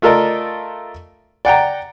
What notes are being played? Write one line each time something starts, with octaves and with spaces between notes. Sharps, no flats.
A3 F4 A4 A#4 D5 D#5
D5 F#5 G5 A#5